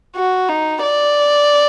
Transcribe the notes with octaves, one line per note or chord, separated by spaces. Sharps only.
F#4
D#4
D5